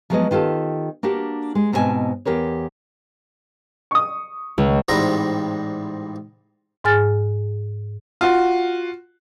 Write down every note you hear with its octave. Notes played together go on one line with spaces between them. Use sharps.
F3 F#3 G#3 B3 G#4 D#5
D#3 F4 G4 A4
A#3 D4 F#4 G4
G#3
G#2 B2 C4 A4 G#5 A5
E2 G4 A#4 C#5
C#6 D#6
C#2
A1 G#2 G3 C4 E4 A#5
G#2 G#4 G#5 F6 A6
F4 F#4